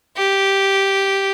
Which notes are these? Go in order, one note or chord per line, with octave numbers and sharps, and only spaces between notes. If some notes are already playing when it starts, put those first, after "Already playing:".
G4